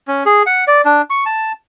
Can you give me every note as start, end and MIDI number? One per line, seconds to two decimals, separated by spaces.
0.08 0.23 61
0.26 0.43 68
0.46 0.64 78
0.67 0.81 74
0.85 1.02 62
1.10 1.24 85
1.26 1.52 81